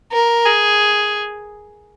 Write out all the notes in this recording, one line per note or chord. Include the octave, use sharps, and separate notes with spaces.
A#4
G#4